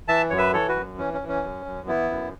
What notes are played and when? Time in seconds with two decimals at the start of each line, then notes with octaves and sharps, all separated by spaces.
0.08 E3 E5 A5
0.30 F#2 C#5
0.38 B4 E5
0.53 E3 A4 C#5
0.68 F#4 B4
0.75 F#2
0.98 E3 C#4
1.13 C#4
1.21 E3
1.28 C#4
1.43 F#2
1.66 F#2
1.87 E3 B3 E4
2.11 F#2